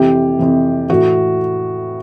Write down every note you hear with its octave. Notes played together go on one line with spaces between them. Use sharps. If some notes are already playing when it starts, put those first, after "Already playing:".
Already playing: F2 C3 E3 G4
F2 C3 E3
A2 E3 F#4